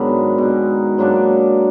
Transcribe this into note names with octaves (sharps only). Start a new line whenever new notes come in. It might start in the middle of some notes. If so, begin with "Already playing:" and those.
Already playing: G#2 D#3 F#3 B3 D4
B2 G#3 D#4
G#2 F#3 A#3 D4